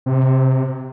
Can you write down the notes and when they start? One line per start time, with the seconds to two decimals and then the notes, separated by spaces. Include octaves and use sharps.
0.06 C3